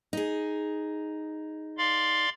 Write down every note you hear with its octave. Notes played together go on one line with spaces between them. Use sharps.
D#4 G#4
D5 F5 C6